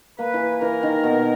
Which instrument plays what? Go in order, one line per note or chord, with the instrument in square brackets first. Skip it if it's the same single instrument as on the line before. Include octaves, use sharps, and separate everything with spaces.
[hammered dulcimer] A#3 [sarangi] B4
[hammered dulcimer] E3
[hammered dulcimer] E3 [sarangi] A#4
[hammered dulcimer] D#3
B2